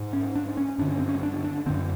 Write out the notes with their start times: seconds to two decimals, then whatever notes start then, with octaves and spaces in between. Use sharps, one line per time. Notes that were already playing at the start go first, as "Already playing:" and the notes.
Already playing: G#2
0.13 C#4
0.36 D4
0.57 C#4
0.78 G2 D3 D4
0.88 C#4
0.99 C4
1.09 C#4
1.23 D4
1.44 D4
1.66 D3 C4
1.70 F#2